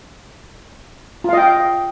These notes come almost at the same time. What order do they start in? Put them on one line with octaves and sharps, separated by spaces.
F4 F5 D#5 G5